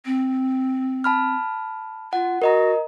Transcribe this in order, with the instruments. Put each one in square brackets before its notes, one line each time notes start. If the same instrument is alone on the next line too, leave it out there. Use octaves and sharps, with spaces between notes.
[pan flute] C4
[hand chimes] A5 B5 F6
[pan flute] F4 [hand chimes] F#5
[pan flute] F#4 [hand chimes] A#4 D#5 A#5